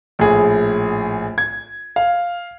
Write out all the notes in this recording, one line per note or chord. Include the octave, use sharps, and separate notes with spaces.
A#1 A2 G#4
G#6
F5